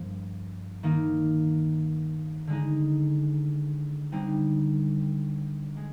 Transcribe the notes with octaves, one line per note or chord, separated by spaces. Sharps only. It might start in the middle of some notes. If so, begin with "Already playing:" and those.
Already playing: G2 F3 A#3
D#3 A#3 D#4
D3 G#3 D#4
D3 G3 C4 D#4
G#3